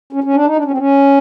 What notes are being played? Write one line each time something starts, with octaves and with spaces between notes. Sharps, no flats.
C#4
C#4
D4
D#4
D4
C#4
C4
C#4